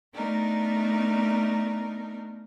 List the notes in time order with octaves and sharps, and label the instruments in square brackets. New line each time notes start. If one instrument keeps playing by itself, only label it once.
[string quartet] A3 B3 D4 D#4 A#4